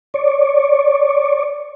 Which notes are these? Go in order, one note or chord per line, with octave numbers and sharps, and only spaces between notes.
C#5 D5